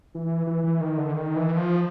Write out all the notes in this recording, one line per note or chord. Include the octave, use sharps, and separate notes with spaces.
E3
E3
E3
D#3
D3
D#3
E3
F3